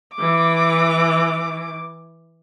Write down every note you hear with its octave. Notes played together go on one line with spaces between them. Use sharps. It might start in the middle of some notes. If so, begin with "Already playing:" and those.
E3 D6